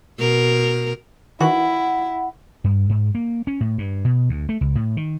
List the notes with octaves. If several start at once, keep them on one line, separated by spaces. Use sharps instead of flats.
B2 A#4
D#3 E3 E4 F#4 F#5
G2
G#2
A#3
C#4
A2
G2
B2
D2
A3
C#2
A2
D#3